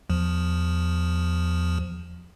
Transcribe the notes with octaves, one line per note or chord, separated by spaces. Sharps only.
E2 F3